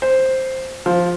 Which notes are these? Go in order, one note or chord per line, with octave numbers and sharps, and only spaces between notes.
C5
F3